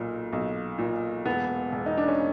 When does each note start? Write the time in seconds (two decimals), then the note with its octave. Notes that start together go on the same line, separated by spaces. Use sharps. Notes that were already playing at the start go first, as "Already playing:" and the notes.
Already playing: B1 A#2
0.33 B1
0.78 A#2
1.26 E1 B3
1.73 E1
1.86 D#4
1.98 D4
2.08 C#4